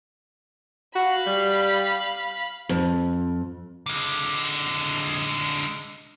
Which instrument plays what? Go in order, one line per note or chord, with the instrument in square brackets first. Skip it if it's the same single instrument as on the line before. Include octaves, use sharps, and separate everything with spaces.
[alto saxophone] F#4 [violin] F5 B5
[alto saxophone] G3
[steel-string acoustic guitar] F2
[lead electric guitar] D3 G#3